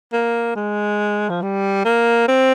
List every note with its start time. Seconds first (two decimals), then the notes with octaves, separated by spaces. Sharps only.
0.12 A#3
0.55 G#3
1.30 F3
1.42 G3
1.85 A#3
2.28 C4